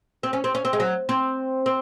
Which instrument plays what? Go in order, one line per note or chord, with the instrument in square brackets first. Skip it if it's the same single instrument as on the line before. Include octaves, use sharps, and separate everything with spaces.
[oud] C4
C#4
C4
C#4
C4
G#3
F#3
C4
C4